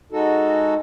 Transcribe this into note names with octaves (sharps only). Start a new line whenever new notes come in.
G#3 D#4 F#4 A4